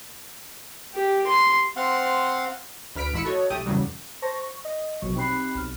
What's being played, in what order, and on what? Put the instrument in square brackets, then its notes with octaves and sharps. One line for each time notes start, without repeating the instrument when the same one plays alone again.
[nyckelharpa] G4
C6
[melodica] C4 F5 F#5 C6
[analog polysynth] D2 B4 F6 B6 D7
A1 G#2 E4 B5 E6 C#7
F#4 A4 C#5 D#5
B1 A3 G4 D#6
E2 A2 C#3 F#3 G3
[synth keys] C5 A5 C#6 A#6
C#6
D#5
A#1 B2 F#3 C#6
C4 D#4 G4 B5 F#6 C7
B1 F6